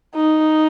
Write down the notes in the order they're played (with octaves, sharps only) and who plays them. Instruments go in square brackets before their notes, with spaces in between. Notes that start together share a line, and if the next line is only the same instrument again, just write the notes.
[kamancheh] D#4